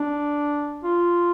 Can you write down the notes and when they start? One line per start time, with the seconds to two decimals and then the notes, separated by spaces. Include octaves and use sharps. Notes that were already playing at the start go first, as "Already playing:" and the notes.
Already playing: D4
0.84 F4